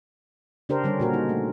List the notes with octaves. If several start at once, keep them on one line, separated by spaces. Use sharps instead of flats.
C#3 D4 G4 A#4 C5
D3 G3 C#4
A#2 F#4 A#4
D#4
A3